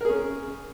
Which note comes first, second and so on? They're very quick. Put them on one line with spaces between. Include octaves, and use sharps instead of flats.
A#4 G#4 C#4